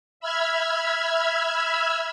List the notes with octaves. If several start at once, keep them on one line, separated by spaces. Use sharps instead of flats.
E5 B5 E6 F6 G#6